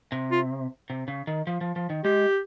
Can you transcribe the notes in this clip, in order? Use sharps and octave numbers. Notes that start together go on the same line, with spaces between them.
C3
F4
C3
C#3
D#3
F3
F3
F3
D#3
G#3 G4